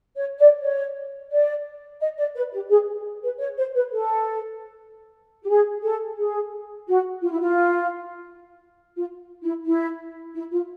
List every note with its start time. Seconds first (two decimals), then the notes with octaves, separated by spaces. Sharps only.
0.15 C#5
0.39 D5
0.62 C#5
1.31 D5
2.00 D#5
2.18 D5
2.35 B4
2.53 G4
2.71 G#4
3.23 B4
3.40 C#5
3.57 C5
3.75 B4
3.92 A4
5.43 G4
5.49 G#4
5.83 A4
6.17 G#4
6.87 F#4
7.22 F4
7.30 E4
7.40 F4
8.96 F4
9.43 E4
9.65 E4
10.35 E4
10.52 F4